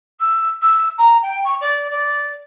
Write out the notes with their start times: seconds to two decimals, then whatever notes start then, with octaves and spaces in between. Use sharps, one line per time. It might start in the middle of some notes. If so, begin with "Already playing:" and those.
0.20 E6
0.61 E6
0.98 A#5
1.22 G5
1.44 C#6
1.61 D5
1.90 D5